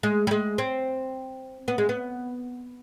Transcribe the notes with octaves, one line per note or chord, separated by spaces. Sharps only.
G#3
G3
G#3
C4
B3
G#3
B3